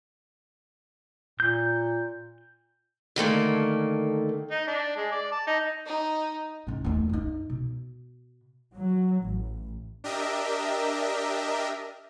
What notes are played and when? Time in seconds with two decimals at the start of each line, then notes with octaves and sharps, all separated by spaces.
1.40 A#2 G6
3.16 D3 D#3 A3 A#3
4.51 D#4
4.67 D4
4.96 G#3
5.11 D5
5.32 A5
5.47 D#4
5.86 D#4
6.67 G#2 C#4
6.84 D#2 A3
7.09 G2 D#4
7.50 B2
8.77 F#3
9.24 A1
10.04 D4 G4 A#4 D#5 E5